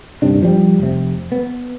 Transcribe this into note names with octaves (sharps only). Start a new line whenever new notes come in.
D#1 G2 C3 D4
F3 G3
F1 C3
B3